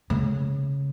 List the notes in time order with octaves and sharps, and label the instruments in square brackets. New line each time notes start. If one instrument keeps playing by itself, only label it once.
[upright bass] C#3